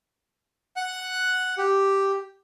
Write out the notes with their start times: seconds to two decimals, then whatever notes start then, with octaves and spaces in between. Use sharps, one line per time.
0.76 F#5 F#6
1.58 G4